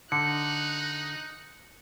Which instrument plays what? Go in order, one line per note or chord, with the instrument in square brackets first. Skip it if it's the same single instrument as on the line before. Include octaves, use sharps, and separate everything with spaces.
[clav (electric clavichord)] D3 [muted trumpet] D#4 [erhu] F#6 [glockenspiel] C#7